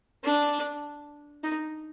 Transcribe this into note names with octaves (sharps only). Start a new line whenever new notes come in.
D4
D#4